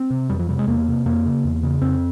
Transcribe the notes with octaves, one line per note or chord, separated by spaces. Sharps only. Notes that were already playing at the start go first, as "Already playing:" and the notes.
Already playing: C4
C3
F2 G3
F3
C3 G3
G#3
E2 A#3
C3
F2 A#3
C#3
E2
C#3
F2 C4